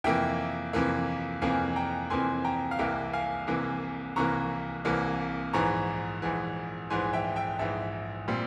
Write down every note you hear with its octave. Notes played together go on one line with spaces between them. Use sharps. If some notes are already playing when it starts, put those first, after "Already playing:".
F2 C3 E3 A#3 E5 G5
F2 C3 E3 A#3
F2 C3 E3 A#3 F5 G#5
G5 A#5
F2 C3 E3 A#3 G#5 C6
G5 A#5
F5
C2 C3 E3 A#3 E5 G5
F5 G#5
C2 C3 E3 A#3
C2 C3 E3 A#3 A#5 C#6
C2 C3 E3 A#3
A#1 G#2 E3 A#5 C#6
A#1 G#2 E3
A#1 G#2 E3 G#5 C6
E5 G5
E5 G5
A#1 G#2 E3 E5
A#2 G3 C4